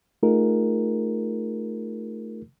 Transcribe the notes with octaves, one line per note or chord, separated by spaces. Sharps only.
A3 D#4 F4 G#4 A#4